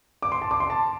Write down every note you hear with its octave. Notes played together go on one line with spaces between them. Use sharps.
D6
C6
A5
D6
C6
A5